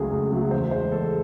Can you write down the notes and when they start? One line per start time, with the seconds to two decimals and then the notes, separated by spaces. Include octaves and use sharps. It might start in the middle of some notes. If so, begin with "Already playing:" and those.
Already playing: C#2 C#3 F#3 A3 G#4
0.11 C#2
0.31 C#3 F#3 A3
0.51 E2 C5
0.71 C#3 G#3 C5
0.92 E2 A4